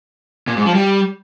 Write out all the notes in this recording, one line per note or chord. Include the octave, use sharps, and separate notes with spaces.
A#2
G#2
F3
G3